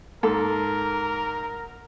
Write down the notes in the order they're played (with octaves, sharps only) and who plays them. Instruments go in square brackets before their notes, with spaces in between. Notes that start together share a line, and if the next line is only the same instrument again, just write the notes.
[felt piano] G#2 [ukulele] A4 [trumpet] A#4